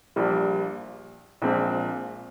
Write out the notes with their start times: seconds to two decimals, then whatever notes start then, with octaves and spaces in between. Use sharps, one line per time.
0.16 A#1 A#2 G3
1.42 A#1 A#2 G#3 C4